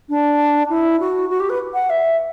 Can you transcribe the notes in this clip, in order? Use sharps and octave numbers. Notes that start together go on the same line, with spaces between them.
D4
E4
F#4
F#4
G4
B4
F#5
E5